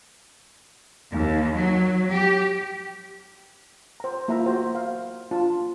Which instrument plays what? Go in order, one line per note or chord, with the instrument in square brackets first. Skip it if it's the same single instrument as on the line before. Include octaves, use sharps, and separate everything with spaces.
[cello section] D#2
F#3
G4
[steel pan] C5 A#5
A#3 E4 F4 E5 A#5
A#3 F#4 C5
F5
D4 F4 A5